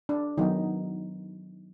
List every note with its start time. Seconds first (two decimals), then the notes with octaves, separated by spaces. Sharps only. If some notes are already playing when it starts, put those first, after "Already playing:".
0.09 D4
0.37 D#3 F#3 B3 D#4